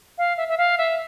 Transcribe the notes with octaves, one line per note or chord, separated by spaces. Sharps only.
F5
E5
E5
F5
E5